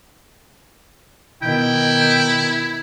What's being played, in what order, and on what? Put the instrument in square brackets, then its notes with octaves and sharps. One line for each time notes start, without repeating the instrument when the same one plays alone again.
[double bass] B2 D#3 [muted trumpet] E4 [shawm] G5